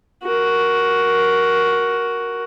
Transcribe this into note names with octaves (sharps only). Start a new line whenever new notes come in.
F#4 A#4